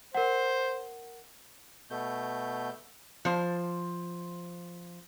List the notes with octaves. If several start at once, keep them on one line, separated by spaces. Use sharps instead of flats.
A#4 C5 F#5
B2 A3 G6
F3 C5